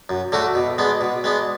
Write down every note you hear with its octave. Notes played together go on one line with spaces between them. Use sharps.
F#2
D3 A3 D4 F#4
B2
G#3 B3 D4
B2
G#3 B3 D4